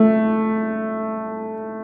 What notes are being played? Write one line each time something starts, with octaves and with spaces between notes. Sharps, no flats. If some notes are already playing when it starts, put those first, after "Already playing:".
Already playing: A3